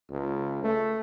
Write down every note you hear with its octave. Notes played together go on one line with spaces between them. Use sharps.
C#2
A3